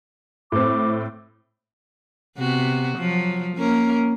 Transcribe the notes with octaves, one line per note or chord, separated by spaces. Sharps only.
A2 C4 D6
C3 B3 F#4
F3 F#3
A#3 C#4 A#4